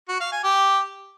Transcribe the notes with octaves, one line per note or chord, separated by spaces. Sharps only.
F#4
F5
G#5
G4